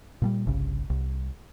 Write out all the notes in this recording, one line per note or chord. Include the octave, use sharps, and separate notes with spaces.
A#2 F#3 G3
G1 C2 C#3
C2